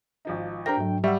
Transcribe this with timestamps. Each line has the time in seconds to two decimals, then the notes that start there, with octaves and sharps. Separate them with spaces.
0.25 G#1 F3 D#4
0.66 D4 G4 A#4 C5 G5 A#5 A#6
0.77 G#2 F#3 A3
1.04 G3 E5 F#5 C#6 E6